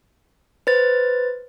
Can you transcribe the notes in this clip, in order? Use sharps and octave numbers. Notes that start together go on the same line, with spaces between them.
B4 C5 A6